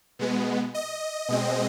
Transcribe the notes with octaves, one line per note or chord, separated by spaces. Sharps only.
B2 G#3 B3
D#5
B2 G#3 C4